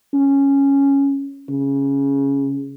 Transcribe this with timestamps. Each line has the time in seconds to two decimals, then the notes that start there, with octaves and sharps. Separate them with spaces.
0.14 C#4
1.49 C#3